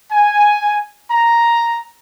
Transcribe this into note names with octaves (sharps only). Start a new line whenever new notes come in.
G#5
A#5